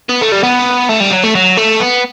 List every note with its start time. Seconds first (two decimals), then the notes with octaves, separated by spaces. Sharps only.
0.09 B3
0.21 A3
0.32 G3
0.43 B3
0.89 A3
1.00 G3
1.11 F#3
1.24 A3
1.35 F#3
1.57 A3
1.80 B3